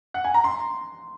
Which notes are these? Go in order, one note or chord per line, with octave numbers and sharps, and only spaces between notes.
F#5
G#5
A#5
C6